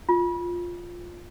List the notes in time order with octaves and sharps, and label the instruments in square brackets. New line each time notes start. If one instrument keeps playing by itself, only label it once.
[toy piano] F4